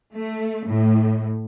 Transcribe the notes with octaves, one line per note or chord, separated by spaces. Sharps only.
A3
A2